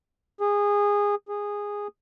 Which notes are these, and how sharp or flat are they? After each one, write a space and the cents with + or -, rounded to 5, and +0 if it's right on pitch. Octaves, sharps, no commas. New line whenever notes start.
G#4 -20
G#4 -15